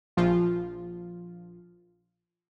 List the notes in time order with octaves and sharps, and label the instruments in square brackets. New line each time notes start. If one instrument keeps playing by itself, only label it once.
[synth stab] A#1 F3 F4